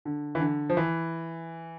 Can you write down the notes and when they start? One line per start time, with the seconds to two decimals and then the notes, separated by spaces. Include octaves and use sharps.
0.05 D3
0.35 E3
0.40 D3
0.70 F3
0.77 E3